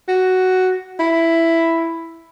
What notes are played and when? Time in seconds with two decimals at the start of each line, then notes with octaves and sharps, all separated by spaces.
0.08 F#4
1.00 E4